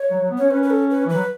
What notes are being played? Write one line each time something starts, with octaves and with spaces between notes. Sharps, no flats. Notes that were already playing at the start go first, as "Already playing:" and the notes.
Already playing: C#5
F#3
F#3
B3
C#4 C#5
C#4 B4
B4
A4
B4
E3
F#3 B4